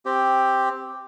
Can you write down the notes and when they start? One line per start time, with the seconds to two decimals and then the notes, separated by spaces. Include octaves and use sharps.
0.06 C4 G4